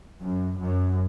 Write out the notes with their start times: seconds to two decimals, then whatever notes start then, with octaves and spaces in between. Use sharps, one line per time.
0.22 F#2
0.59 F#2